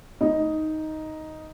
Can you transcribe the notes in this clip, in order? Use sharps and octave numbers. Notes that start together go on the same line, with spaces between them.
D#4